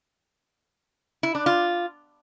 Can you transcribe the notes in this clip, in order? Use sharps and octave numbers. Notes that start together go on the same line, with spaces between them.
E4
D4
F4